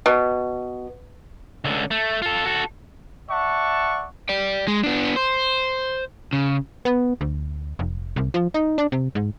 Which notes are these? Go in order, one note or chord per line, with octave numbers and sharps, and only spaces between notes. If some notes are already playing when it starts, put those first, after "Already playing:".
B2
C#2 D3
A3
F4 A4
F#4 A4
D5 E5 F#5 A5 C#6
D5 G5
G#3
B3 D4
C5
C#3
B3
D2
F1
C2
F3
D#4
D4
C3
G#2